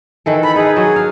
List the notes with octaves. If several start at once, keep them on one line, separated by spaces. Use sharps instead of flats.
D#3 E3 A4
A4 B5
D#4 G#4 B4
F#3 F#4 G#4
F5